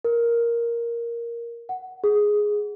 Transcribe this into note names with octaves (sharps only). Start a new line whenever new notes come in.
A#4
F#5
G#4